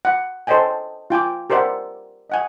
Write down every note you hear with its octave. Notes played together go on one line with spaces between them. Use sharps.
F#5
A4 C5 C#5 D#5 G5 G#5
F4 G5 G#5 D6
G4 A#4 C5 D5 E5 F#5
D#5 F#5 G#5